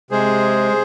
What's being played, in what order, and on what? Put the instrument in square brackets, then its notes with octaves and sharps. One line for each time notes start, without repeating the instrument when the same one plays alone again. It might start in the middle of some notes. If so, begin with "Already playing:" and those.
[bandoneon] C3 G#3 G#4 C5